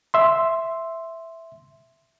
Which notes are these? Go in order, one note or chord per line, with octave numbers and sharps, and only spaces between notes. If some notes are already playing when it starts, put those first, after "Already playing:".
E5 C6